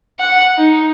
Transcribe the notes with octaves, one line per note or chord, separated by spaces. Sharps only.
F#5
D#4